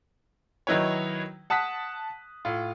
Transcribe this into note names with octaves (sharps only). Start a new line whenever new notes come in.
D#3 F#3 D#4 E4 B4 C#5
F#5 A5 D#6 F#6 B6
A2 F4